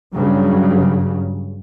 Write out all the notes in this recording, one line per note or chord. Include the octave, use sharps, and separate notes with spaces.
G2 C#3 F#3